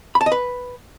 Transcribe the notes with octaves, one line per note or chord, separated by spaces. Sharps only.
B5
A5
D#5
B4